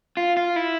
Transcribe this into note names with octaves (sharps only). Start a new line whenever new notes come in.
F4
F4
E4